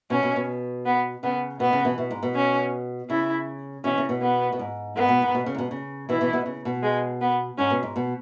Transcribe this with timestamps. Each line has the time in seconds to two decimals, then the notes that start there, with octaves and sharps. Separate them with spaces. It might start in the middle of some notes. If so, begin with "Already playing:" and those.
0.10 B2 C#4
0.23 B2
0.36 B2
0.86 B3
1.23 C#3 B3
1.60 B2 B3
1.73 C#3
1.85 B2 E3
1.98 B2
2.11 G#2
2.23 B2
2.36 C#4
3.10 C#3 E4
3.84 B2 E3 C#4
3.98 C#3
4.09 B2
4.22 B3
4.52 B2
4.59 G#2
4.96 G#2 B3
5.09 B2
5.22 G#2
5.35 B2
5.46 C#3
5.54 G#2
5.58 B2
5.71 C#3
6.09 B2 E3 E4
6.21 B2 E3
6.33 B2
6.46 C#3
6.65 B2
6.83 G#3
7.21 B3
7.58 G#2 C#4
7.70 B2
7.83 G#2
7.96 B2